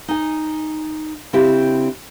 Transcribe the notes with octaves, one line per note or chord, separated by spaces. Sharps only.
D#4 G#5
C#3 C4 D4 E4 G4